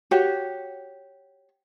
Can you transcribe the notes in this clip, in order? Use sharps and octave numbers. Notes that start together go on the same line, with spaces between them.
F#4 G4 C#5